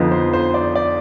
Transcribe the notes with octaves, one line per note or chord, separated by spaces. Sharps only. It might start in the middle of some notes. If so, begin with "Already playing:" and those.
Already playing: F2 D3 F3 B3 D#4
C5
C5
D5
D5